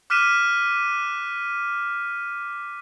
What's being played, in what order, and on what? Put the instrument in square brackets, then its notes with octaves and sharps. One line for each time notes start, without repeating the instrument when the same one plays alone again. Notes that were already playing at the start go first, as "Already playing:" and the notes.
[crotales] D6 F6 F#6 B6 D#7 E7